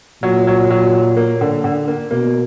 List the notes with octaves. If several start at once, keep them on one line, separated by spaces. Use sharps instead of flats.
A#2 F#3
F#3
F#3
F#3
A#3
D3
D3
A#3
B2 A#3